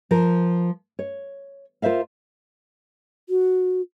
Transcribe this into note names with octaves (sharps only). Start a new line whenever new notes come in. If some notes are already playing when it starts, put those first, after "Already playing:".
F3 A#4
C#5
F4 A#4 C5 E5 F5
F#4